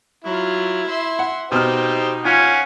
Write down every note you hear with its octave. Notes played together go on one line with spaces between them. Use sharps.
F#3 E4 F4
E5 C6
F#5
B2 D#4 G4 C5 F6
C#4 F4 F5 F#5 G#5